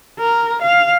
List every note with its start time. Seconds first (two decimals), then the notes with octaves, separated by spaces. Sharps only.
0.19 A#4
0.62 F5